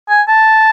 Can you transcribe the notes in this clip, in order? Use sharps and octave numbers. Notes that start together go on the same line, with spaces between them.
G#5
A5